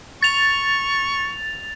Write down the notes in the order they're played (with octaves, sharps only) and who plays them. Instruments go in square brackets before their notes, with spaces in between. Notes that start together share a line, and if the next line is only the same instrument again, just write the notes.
[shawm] C#6 [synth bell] A6 F7